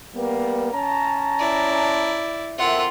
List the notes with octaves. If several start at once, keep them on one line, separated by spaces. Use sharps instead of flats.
G3 A#3 B3
C#4 A5 A#5
E4 D5
F2 F4 A#4 E5 F#5